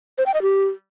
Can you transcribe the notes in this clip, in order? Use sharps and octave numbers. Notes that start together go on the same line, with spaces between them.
C5
G5
D#5
G4